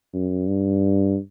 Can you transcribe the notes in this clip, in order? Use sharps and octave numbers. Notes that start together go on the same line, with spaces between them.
F#2
G2